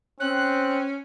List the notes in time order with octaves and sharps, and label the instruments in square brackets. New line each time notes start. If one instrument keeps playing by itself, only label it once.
[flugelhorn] C4 [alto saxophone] C#4 [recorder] F#6